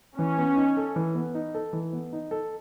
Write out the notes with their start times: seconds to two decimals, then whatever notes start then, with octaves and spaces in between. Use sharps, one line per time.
0.18 E3 C#4
0.38 B3
0.56 D#4
0.77 A4
0.96 E3
1.15 B3
1.35 D#4
1.54 A4
1.73 E3
1.93 B3
2.13 D#4
2.31 A4